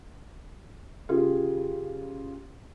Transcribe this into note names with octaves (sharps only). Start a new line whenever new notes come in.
C#3 F4 G4 G#4